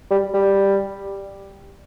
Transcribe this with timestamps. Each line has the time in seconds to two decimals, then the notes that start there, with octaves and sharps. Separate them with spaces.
0.11 G3
0.34 G3